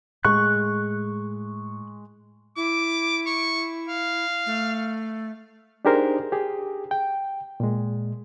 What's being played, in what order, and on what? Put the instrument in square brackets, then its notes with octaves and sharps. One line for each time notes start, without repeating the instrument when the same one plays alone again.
[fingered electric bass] A2 [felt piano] G#3 [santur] C#6 [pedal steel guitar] F#6
[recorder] E4 [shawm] D6
[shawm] C#6
F5
[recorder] A3
[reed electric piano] D4 D#4 G4 G#4 A#4 C5
G4 G#4
G5
A#2 G#3